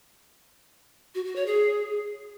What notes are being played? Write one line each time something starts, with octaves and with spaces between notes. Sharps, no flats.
F#4
F#4
C#5
G#4